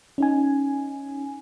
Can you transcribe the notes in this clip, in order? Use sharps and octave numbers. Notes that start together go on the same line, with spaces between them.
C#4 D#4 G#5